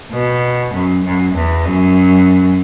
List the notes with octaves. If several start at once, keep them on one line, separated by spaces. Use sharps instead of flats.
B2
F#2
F#2
E2
F#2